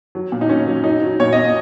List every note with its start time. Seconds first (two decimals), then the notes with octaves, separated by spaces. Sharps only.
0.15 F#3
0.32 A#2
0.41 D#4
0.49 F#3 C#4
0.67 F#3
0.84 F#3 D#4
1.02 F#3
1.20 A#2 C#5
1.33 A#2 D#5